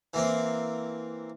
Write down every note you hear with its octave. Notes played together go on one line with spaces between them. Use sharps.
E3 A#3 C4